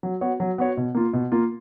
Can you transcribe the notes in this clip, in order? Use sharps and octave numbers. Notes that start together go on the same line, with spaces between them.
F#3
B3 F#4 C#5
F#3
B3 F#4 C#5
B2
A#3 F4
B2
A#3 F4